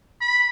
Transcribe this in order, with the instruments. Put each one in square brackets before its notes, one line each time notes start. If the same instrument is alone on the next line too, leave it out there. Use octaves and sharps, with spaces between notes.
[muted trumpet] B5